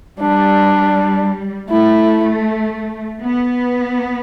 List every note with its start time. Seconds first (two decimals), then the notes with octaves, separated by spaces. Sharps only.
0.20 G3 D4
1.70 A3 E4
3.21 B3